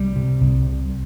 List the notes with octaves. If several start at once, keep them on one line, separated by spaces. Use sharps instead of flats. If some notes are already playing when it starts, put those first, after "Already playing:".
Already playing: C2 G3
C3
C2
C3